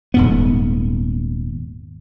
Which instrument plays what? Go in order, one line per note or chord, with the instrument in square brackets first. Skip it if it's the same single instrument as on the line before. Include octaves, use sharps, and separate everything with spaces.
[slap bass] D#1 G#2 B3